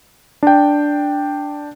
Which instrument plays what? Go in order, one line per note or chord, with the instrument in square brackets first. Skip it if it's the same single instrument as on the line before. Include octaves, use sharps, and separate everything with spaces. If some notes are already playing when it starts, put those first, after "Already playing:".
[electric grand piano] D4 G5